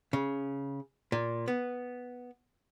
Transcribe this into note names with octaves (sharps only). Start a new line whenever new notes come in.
C#3
A#2
B3